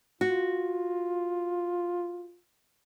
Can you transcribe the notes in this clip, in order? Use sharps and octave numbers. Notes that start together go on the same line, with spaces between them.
F4 F#4